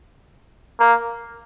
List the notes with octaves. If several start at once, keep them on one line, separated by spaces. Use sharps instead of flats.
A#3